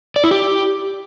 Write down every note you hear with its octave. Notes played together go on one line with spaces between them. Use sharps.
D5
E4
G4